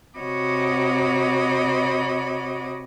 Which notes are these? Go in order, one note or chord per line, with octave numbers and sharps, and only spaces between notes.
C3 F#4 C#5 D#5 B5 D6